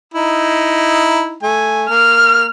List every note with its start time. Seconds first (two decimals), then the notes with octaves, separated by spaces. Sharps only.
0.14 D#4 E4
1.43 A3 G#5
1.89 A#3 F6